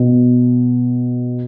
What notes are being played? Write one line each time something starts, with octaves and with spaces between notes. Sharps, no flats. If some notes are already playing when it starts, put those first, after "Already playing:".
Already playing: B2